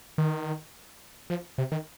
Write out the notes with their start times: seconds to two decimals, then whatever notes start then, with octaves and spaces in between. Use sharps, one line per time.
0.18 D#3
1.30 F3
1.58 C3
1.72 D#3